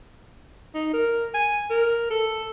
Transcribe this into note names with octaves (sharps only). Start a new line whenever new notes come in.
D#4
A#4
G#5
A#4
A4